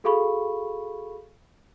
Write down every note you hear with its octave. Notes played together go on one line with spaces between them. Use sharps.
F#4 G#4 A4 F5 B5 C#6